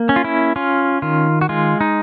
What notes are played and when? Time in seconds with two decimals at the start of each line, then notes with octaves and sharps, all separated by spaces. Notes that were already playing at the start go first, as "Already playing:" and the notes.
Already playing: A#3
0.09 C#4
0.16 F4
0.24 E4
0.56 C#4 F4
1.02 D#3 F4
1.41 F#4
1.49 G#3 F4
1.81 D#4